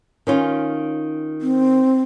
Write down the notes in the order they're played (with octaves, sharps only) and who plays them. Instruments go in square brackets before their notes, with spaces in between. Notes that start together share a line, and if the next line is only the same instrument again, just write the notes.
[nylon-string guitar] D#3 C#4 F4
[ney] C4